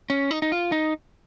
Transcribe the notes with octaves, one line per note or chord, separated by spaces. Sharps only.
C#4
D#4
D#4
F4
D#4